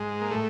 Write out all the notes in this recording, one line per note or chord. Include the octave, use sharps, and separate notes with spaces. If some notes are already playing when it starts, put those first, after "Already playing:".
Already playing: G#2 G#3
A#3
A2 A3